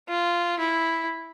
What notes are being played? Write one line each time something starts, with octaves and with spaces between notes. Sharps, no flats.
F4
E4